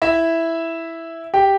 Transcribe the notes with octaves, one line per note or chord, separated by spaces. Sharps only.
E4 E5
G4 G5